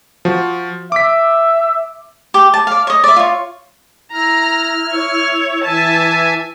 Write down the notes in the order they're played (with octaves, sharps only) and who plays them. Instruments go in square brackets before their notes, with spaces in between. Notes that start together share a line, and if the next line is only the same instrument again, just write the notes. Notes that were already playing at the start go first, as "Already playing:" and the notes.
[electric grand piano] F3 F#4
[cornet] E5 [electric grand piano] D6 B6
[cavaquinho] G4
A5
D5 F5
C#5 D#5
D5 E5
F4 C#5
[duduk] E4 [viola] A#5 [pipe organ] F6
[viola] C#5
[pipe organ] E3 E5 G#5 [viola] A5